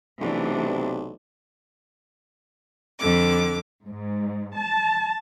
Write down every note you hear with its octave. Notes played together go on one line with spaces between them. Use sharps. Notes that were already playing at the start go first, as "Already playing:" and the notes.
B1 C3 E3 A3 D4
F2 D3 D6
G#2
A5